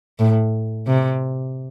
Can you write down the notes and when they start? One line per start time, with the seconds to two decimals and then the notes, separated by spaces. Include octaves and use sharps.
0.19 A2
0.87 C3